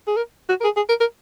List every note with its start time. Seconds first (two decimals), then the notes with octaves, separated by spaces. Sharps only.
0.07 G#4
0.17 A#4
0.49 F#4
0.60 A#4
0.64 G#4
0.76 G#4
0.89 A#4
1.00 A#4